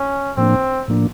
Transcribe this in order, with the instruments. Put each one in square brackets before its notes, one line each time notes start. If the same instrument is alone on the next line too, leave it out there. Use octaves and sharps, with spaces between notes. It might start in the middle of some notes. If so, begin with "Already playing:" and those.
Already playing: [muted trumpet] C#4
[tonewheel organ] A2 F3 A#3 D4 [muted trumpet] C4
[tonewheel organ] A2 F3 A#3 D4